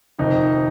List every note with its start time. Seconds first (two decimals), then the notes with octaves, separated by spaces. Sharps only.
0.19 F1 F2 D#3 D#4